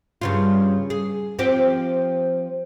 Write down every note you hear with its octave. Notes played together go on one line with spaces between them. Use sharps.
G2 C#3 F4
G#4
F3 C4 G4